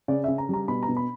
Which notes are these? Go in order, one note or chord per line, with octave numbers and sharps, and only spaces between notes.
C#3 D5
C#3 E5
A#5
G3 A#5
B2 B5
A#5
B2
B5